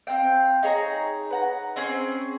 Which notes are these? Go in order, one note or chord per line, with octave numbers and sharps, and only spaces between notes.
C4 F5 G5
D#4 G#4 C#5 A#5
B4 F#5 A#5
C4 C#4 G#4 G#5